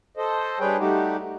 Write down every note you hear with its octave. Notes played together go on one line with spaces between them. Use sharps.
A4 C5 D#5
G3 D4 G#4 B4 C#5 G5
G3 A3 D#4 F#4 G4